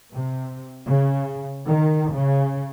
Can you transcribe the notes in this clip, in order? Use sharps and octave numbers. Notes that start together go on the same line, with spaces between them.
C3
C#3
D#3
C#3